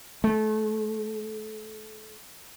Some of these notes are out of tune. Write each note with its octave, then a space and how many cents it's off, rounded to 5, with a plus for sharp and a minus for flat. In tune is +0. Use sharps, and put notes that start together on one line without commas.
A3 -30